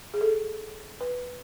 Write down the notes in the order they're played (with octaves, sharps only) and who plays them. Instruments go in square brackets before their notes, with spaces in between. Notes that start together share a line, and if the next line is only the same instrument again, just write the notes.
[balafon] G#4
A4
B4